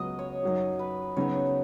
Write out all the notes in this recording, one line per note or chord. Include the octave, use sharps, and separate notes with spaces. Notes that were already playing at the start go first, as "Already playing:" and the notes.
Already playing: C#2 C#3 F#3 B3 D#5
C#5
F#2 F#3 D#4 F#4
B4
C#3 F#3 B3 D#4 F#4 C#5